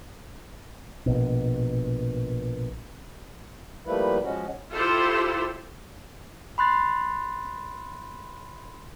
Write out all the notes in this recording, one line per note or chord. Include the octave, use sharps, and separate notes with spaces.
A#1 B2
F3 G3 A3 A#3 E4 B4
F3 G#3 C#4 F#4
E4 F4 G4 A4 C5
B5 C6 F#6 A6